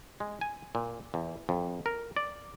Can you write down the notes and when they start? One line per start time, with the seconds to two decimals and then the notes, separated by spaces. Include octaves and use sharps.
0.20 G#3
0.41 G#5
0.75 A#2
1.14 E2
1.49 F2
1.86 A#4
2.16 D5